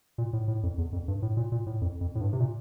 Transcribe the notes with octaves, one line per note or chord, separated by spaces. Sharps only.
A#2
A2
A2
F2
E2
F2
G2
A2
A#2
A#2
A2
F2
F2
A2
G2
C3
A#2